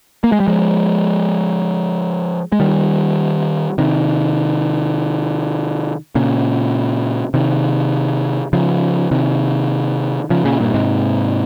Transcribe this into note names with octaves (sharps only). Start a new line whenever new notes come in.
A#3
G#3
G3
F3 G#3
G#3
D#3 G3
C3 D#3
A#2 C#3
C3 D#3
C#3 F3
C3 D#3
C#3 F3
A#2 C#3
G2 A#2
G#2 C3